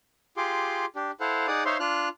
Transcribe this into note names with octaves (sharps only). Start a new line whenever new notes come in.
F4 G4 G#4 C6 D6
D4 G4
E4 A4 C5 F5 F#5
D#4 G#4 D5 F#5 D#6
D#4 C5 C#5 E5 F5 C6
D4 F4 F6 F#6